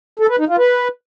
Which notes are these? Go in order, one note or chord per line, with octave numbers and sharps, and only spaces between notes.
A4
B4
D#4
F4
B4